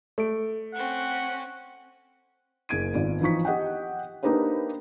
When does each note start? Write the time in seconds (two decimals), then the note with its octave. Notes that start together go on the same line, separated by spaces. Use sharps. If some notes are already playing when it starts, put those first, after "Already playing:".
0.18 A3 A4 D7
0.74 C4 C#4 F#5
2.69 F#1 A#3 G#4 G#6 D7 D#7
2.94 G#1 B3 F4 D5
3.21 E3 F3 D#4 C#6 B6
3.45 G4 D#5 F#5 G5
4.23 A#3 D4 D#4 G4 B4 C5